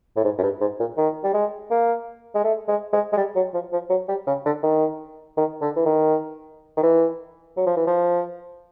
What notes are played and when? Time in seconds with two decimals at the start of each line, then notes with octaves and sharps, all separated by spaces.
0.16 A2
0.24 G#2
0.38 F#2
0.43 G2
0.61 G#2
0.80 A#2
0.97 D#3
1.24 G3
1.34 G#3
1.70 A#3
2.35 G#3
2.44 A3
2.68 G#3
2.93 G#3
3.13 G#3
3.17 G3
3.35 F#3
3.54 F3
3.72 F3
3.90 F#3
4.08 G3
4.27 C#3
4.45 D3
4.63 D#3
5.37 D#3
5.61 D3
5.76 E3
5.86 D#3
6.77 D#3
6.83 E3
7.57 F#3
7.66 F3
7.76 E3
7.87 F3